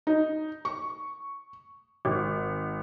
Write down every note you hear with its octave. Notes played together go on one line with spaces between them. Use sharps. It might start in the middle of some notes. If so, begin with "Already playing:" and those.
D#4
C#6
G#1